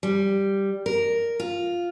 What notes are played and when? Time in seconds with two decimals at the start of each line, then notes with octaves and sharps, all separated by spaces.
0.03 G3
0.86 A#4
1.40 F4